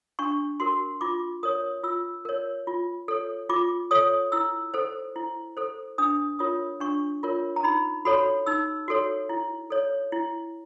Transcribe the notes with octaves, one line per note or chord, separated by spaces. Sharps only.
D4 C#6
F#4 A#4 C6
F4 D6
A#4 C#5 D#6
F4 E6
A#4 C#5
F4
A4 C#5
F4 D6
A4 C#5 D#6
E4 E6
A4 C5
E4
A4 C5
D4 D#6
F4 A#4 C#5 D#6
D4 C#6
F4 A#4 C#5
A#5
D#4 B5
F#4 A4 C#5 B5
D#4 E6
F#4 A4 C#5
E4
A4 C#5
E4